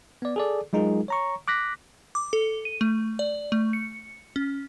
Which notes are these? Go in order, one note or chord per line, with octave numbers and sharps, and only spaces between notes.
B3 D5
G#4 A4 D5
F#3 G#3 D#4 F4 G#4 A#4
C#5 A#5 C#6
D6 F#6 A#6 B6
D6
A4
D#7
A3
D5
A3
C#7
C#4